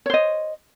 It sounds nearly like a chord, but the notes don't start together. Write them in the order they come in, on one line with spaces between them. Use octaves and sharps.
C#5 C5 D#5